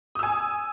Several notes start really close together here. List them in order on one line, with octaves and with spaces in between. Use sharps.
D#6 E6 G#5